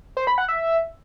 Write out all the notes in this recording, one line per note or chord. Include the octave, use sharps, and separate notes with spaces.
C5
B5
F#5
E5